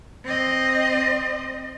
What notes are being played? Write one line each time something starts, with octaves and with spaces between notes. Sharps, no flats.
C4 D#5